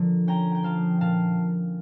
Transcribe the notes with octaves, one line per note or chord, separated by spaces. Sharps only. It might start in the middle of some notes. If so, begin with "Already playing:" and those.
Already playing: D3 F3 A#3
C#4 G5 A#5
G5
F3 F5 A5
A#2 F5 A5